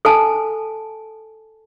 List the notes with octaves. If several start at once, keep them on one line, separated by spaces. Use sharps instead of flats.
A4 G#5 A5